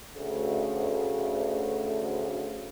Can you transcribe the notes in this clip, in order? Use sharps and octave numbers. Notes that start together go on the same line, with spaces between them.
D2 C#3